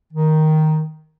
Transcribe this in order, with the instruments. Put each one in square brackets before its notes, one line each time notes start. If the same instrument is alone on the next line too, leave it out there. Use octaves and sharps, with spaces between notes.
[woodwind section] D#3